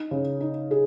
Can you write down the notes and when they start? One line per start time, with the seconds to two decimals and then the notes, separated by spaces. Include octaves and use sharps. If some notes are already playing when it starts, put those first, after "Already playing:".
Already playing: D#4
0.11 C#3
0.41 D#4
0.71 G#4